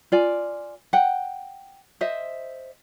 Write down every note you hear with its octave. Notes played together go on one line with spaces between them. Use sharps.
F4 D5 G#5
F#5 G5
C5 D#5 E5